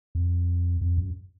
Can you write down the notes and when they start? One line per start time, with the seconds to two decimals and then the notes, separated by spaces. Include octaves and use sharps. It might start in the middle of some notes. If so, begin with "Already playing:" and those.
0.15 F2
0.81 F2
0.98 F#2